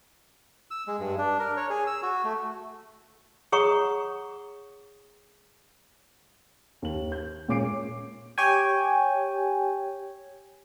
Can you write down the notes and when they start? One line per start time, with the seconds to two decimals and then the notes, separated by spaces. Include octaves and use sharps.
0.71 E6
0.87 G#3
1.00 G2
1.18 D4
1.39 A#4
1.57 C#5
1.70 G#4
1.87 E6
2.03 F#4
2.24 A3
3.52 G#4 C#5 F#5 A#5 C#6 D#6
6.82 D#2 F#7
7.12 G6
7.48 A#2 G#3 C#4 D6 C7 D7
8.38 G4 C#5 G5 G#5